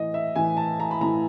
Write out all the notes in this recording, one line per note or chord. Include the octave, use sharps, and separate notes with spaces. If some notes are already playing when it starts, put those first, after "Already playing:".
Already playing: A2 E3 D#5
E5
A2 E3 G#5
A5
A#5
B5
A2 E3 A#5